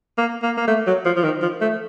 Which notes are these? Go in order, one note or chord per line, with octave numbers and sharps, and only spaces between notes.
A#3
A#3
A#3
A3
F#3
F3
F3
D#3
F3
A3